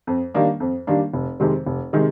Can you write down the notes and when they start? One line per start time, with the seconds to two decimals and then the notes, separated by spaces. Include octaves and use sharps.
0.07 F2
0.34 D#3 G3 A#3 D4
0.60 F2
0.87 D#3 G3 A#3 D4
1.14 F1
1.40 F2 C3 D#3 G#3
1.67 F1
1.93 C3 D#3 G#3